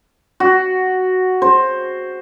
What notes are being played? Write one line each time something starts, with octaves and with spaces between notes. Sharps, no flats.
F#4
C5